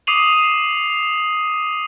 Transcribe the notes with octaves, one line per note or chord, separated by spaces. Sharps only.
D6 D#6 C7 D#7 F7 F#7